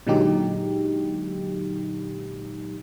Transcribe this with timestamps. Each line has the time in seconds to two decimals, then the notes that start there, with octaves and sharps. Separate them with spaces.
0.07 A#2 D3 F#3 G#3 D#4 G4